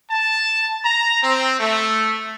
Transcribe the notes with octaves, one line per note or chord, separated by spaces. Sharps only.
A5
A#5
C4
A3